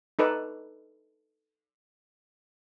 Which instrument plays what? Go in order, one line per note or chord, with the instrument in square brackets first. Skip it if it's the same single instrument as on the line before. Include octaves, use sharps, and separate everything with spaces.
[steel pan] D#4 A4 B4 D5